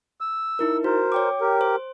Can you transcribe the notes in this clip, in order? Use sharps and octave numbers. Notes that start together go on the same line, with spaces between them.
E6
D#4 E4 A#4
F#4 A#4 C5
C#5 G5 D6
G4 A#4
C5